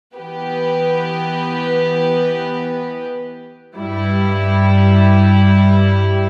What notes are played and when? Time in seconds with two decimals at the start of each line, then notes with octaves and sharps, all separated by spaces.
0.15 E3 B3 G4 B4
3.75 G2 G3 E4